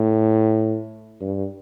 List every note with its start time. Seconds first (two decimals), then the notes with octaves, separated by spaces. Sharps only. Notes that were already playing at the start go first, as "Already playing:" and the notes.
Already playing: A2
1.21 G2